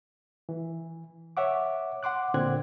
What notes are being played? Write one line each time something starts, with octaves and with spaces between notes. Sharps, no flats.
E3
C#5 E5 F#5 D6
F#5 C6 D6 F#6
A#2 D3 C4 F#6 G#6